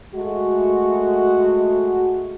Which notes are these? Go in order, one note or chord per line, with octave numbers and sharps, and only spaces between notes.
G#3 A3 F#4